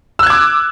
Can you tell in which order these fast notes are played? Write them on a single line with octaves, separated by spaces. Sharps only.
E6 F#6 G#6 D6